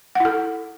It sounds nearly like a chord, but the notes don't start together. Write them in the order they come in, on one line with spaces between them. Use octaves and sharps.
F#5 E4 A4